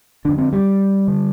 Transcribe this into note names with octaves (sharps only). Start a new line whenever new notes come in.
F2 D3 D4
C4
G3
D3